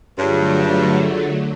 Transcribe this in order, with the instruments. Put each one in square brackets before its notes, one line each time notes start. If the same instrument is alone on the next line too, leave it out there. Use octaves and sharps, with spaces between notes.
[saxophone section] G2 [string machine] D3 F#3 A3 [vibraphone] F4 G#4 C#5